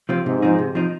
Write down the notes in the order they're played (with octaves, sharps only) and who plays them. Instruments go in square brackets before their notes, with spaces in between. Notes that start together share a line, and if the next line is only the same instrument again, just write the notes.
[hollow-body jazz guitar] C3 F3 C4 F4
[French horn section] G#2 [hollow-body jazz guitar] C3
[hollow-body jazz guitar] F3 C4 D#4
C3
F3 C4 D#4